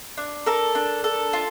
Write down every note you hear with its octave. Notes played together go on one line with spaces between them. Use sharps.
D4
A4 A#4
D4
A4
F4